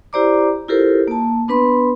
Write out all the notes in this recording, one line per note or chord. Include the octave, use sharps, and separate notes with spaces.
E4 G4 C5 D5 A#5 D6
E4 F4 G4 A4 A#4 C5
A#3 A5
B3 D4 B4 B5 C6